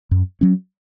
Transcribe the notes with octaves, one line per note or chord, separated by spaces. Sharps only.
F#2
F#3 C#4